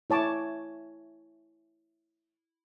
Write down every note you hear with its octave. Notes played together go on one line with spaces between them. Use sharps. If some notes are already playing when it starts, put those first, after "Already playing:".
E4 C#5 A5 D6